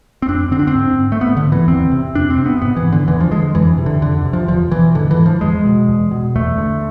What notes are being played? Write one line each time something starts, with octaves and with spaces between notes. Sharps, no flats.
C4
F2 D4
D3 C4
D4
C4
G#2
A3
G#2 B3
D3
E3
E2 C4
C3
F2 D4
C4
C3
B3
G#2 B3
E3
D3
E2 E3
F3
D3 G#3
F2 E3
C3
D3
F2 D3
C3
F3
E2 F3
B2 E3
G#2 D3
E3
F3
E2 G#3
B2
E2
B2
E2 A3
D3